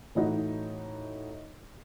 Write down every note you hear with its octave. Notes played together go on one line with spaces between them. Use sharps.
A2 E3 D#4 F#4